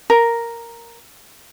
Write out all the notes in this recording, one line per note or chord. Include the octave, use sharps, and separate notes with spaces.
A#4